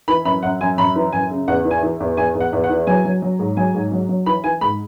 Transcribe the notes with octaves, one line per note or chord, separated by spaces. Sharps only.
E3 B5
F#2 B5
F#2 F#5
F#2 G#5
F#2 B5
E3
F#2 G#5
C#3
E2 F#5
E3
G#5
E3
E2
E2 G#5
E2
F#5
E2
F#5
E3
F#3 G#5
F#3
F#3
G#2
F#3 G#5
G#2
F#3
F#3
E3 B5
E3 G#5
G#2 B5